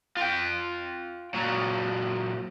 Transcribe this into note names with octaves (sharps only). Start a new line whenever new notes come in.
F4 G5
A#2 F#3